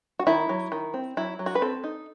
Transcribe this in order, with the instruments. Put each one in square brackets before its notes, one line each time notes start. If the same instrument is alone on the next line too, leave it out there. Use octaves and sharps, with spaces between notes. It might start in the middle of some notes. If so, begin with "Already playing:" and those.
[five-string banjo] F#4
D#3 E4
F#3
D#3
C4
F#3 E4
F#3
F#4
B4
C4 A4
D#4